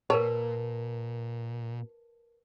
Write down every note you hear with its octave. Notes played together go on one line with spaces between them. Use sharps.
A#2 A#4 B4 C#5 A5